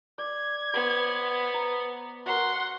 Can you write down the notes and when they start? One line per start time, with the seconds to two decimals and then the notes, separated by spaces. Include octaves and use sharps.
0.18 D5 G#6
0.74 B3 B4 C5
1.54 A#5
2.26 F#4 A#4 F#5 C6